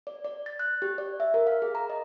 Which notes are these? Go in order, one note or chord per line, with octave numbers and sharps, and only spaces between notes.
D5
D5
A6
F#6
G4
D5
E5
A#4
F5
G#4
A#5
D#5